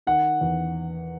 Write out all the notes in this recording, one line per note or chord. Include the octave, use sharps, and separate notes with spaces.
D#3 F#5
E2